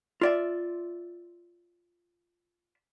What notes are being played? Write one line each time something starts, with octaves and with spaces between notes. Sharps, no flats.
F4 D5 E5